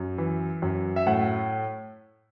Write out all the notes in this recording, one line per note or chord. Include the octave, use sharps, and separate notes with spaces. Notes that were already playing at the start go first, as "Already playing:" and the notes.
Already playing: F#2
E3
F#2
E5
A2 F#5